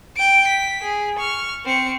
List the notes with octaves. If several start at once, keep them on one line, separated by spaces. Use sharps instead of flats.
G5 D7
B6
G#4
C#6 F6
C4 C#7